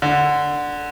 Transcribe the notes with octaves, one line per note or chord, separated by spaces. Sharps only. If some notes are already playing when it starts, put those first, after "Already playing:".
D3